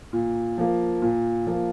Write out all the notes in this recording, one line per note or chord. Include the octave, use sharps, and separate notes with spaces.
A#2
F3 A#3
A#2
F3 A#3